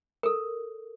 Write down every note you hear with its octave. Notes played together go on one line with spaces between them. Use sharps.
A4 A#4